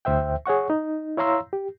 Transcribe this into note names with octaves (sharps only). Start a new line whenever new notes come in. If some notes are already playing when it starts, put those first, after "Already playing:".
D2 C5 E5 G5
G#4 C#5 F#5 C#6
D#4
E4 C#5 F5 A#5 C6 E6
G4